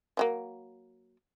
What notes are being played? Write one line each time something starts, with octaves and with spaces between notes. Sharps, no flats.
F3 F#3 A#3